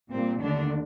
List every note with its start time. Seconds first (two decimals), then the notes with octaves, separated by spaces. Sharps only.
0.11 A#2 G3 A#3 C4
0.41 D#2 D3 D#3 A3 D4